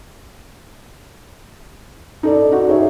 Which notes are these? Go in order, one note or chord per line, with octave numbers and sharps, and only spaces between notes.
D#4 A4 D5
D#4 F#4
G#4 C#5 E5